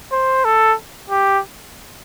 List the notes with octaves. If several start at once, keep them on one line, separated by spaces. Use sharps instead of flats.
C5
A4
G4